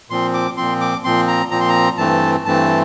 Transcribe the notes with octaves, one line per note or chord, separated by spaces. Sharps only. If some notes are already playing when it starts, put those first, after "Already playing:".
A#2 F3 C4 C6
D6
A#2 F3 C4 C6
D6
A#2 F3 C4 C6
A#5
A#2 F3 C4 A#5
C6
A#5
G2 E3 A3 C4 A5
G2 E3 A3 C4 A5